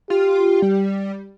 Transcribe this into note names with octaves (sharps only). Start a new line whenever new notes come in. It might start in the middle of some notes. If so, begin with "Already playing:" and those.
F4 G4
G3